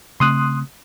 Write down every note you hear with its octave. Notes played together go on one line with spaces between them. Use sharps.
C#3 A3 C4 C6 D#6 F#6